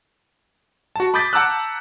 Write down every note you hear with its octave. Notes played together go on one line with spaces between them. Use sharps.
F#4 A5
B5 D6 D#6 G6 A6 B6
F#5 A5 A#5 D6 E6 F#6